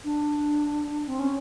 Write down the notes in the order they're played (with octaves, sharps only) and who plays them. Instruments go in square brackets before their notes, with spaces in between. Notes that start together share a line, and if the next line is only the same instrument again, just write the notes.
[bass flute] D4
C4
C#4